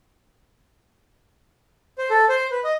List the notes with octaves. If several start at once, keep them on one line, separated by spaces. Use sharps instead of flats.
C5
A4
C5
B4
D#5